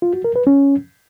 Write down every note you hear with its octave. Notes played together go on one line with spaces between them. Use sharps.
F4
F#4
A#4
B4
C#4